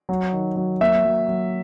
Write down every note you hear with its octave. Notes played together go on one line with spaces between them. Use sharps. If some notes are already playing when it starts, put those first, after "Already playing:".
F#3
D#3
F#3
A#3 E5
F#3
F#3